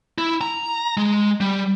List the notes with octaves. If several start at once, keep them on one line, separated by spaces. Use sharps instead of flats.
E4
A#5
G#3
G3